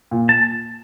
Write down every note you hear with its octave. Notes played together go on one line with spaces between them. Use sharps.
A#2
A5